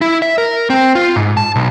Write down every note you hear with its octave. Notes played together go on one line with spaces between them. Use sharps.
E4
E5
A#4
C4
F4
G#2
A5
B1